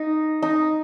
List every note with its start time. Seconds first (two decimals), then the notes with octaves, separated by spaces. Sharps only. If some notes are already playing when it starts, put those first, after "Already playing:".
Already playing: D#4
0.42 D#4